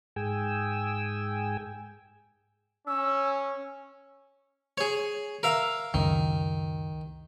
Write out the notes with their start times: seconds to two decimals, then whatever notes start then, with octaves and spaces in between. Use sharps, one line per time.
0.16 G#2 G#4 G5 G#5 E6
2.87 C#4 E6
4.78 G#4 C#5
5.43 A#4 E5 F5
5.94 C#2 F#2 D#3